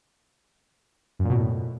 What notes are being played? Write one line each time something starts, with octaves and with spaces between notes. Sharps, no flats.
F#2
A#2
B2
A2